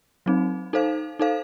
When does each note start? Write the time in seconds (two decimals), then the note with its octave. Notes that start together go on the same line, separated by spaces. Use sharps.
0.26 F#3 C4 D#4
0.73 D#4 A4 C5 F5
1.19 D#4 A4 C5 F5